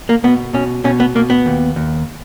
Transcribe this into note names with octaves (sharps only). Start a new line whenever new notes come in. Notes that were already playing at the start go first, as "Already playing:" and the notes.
A#3
B2 B3
B2 C#4
B2 C#4
B3
B2 A#3
B3
D#2
D#2